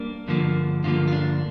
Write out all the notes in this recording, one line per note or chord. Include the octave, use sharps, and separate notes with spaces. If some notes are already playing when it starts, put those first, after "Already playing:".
Already playing: G3 A#3 D4
G2 D3 F3 A#3
G2 D3 F3 A#3 F4
F4
D4